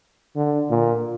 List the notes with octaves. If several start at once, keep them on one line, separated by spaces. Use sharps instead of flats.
D3
A#2